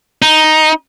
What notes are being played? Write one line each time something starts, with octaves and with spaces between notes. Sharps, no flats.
D#4